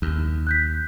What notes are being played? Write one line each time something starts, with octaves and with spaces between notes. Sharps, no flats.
D#2
F#6 G6 B6